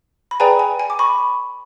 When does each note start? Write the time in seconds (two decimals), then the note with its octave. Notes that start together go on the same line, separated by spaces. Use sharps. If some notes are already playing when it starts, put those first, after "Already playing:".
0.31 B5
0.40 G#4 B4 D5 G5 G#5 A#5
0.59 G#5
0.79 G#5
0.90 D6
0.99 B5 C#6